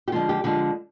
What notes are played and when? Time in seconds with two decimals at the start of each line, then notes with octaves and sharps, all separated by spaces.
0.08 G4
0.12 D3 F3 G#3 F4
0.29 G4
0.44 D3 F3 G#3 G4